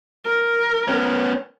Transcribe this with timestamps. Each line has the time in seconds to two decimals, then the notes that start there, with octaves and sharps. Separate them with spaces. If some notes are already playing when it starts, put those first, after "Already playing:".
0.25 A#4
0.88 B3 C#4